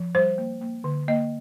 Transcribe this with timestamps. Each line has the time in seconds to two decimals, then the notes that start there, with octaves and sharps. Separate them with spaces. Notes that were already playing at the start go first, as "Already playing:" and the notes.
Already playing: F3
0.15 G3 C5
0.38 A#3
0.61 A#3
0.84 D3
1.08 A#3 D#5